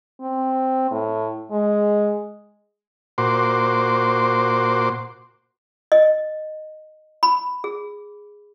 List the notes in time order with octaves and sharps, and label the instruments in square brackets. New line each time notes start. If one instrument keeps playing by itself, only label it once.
[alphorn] C4
A2
G#3
[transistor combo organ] A#2 F#4 C5 C6 D6
[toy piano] D#5
B5
G#4